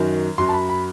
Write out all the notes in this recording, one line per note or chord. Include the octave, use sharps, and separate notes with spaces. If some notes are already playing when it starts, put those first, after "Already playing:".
Already playing: F#2 D#3 F#3
F#2 F#3 C6
A5
B5
B5